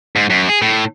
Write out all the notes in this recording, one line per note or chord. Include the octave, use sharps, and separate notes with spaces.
G#2
F#2
G#4
A2